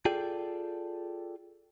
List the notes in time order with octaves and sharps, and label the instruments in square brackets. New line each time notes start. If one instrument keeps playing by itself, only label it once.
[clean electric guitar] F4 G#4 A4 D5 G5